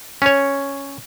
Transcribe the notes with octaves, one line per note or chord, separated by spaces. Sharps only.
C#4 C#5